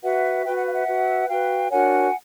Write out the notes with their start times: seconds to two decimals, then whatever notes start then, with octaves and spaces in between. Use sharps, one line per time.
0.02 F#4 B4 E5 F#5
0.44 F#4 B4 G5
0.55 F#5
0.65 F5
0.74 E5 F#5
0.87 F#4 B4
1.28 F#4 B4 F5 G5
1.70 D4 F#4 A#4 C#5 F#5 G#5